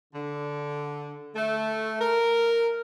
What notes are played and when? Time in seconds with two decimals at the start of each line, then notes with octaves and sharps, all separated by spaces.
0.14 D3
1.36 A3
2.00 A#4